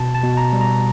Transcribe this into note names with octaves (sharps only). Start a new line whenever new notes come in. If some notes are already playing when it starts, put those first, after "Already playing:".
Already playing: B2 A5
A5
B2
A#5
G3
A#5